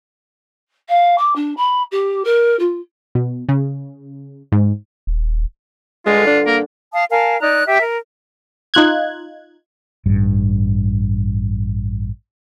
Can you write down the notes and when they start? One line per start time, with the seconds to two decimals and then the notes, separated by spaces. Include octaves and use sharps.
0.88 F5
1.18 D6
1.35 D4
1.57 B5
1.91 G4
2.24 A#4
2.59 F4
3.15 B2
3.49 C#3
4.52 G#2
5.07 D#1
6.06 G2 D3 G#3 F4
6.26 D4
6.46 A#3 A#4
6.94 F5 A5 D#6
7.10 A#4 F5 G#5 A5
7.40 D#4 D5 A#5 F#6
7.66 G4 E5
7.81 A#4
8.74 D#4 F4 F#6 G#6
10.06 A1 G2